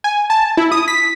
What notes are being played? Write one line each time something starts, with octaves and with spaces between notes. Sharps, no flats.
G#5
A5
E4
D#6
B6